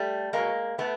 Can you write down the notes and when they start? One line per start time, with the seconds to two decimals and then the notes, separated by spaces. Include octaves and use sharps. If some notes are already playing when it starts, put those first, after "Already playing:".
Already playing: G3 A3
0.33 B2 F#3 G#3 A#3
0.78 A2 A3 B3